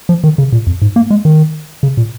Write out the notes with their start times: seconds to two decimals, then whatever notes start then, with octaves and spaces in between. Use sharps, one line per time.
0.09 F3
0.24 D#3
0.38 C#3
0.52 A#2
0.67 F2
0.82 G#2
0.96 A#3
1.10 G#3
1.25 D#3
1.83 C#3
1.97 A#2